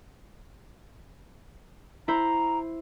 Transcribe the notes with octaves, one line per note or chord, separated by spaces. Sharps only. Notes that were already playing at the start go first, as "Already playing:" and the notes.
E4 C5 A#5